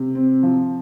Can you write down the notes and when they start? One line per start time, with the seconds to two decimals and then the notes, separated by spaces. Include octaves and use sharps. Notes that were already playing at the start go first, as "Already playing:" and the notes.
Already playing: C3
0.15 C4
0.43 F3